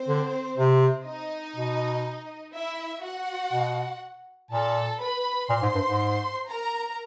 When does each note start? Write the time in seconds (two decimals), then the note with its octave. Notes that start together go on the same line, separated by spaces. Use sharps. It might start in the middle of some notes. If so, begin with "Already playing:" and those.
Already playing: C4 C5
0.08 D3
0.58 C3
1.06 D#4 D#5
1.56 B2
2.54 E4 E5
3.04 F#4 F#5
3.53 B2
4.51 A#2 A4 A5
5.01 B4 B5
5.50 A#2 C5 C6
5.62 G#2
5.75 G2
5.87 G#2
6.48 A#4 A#5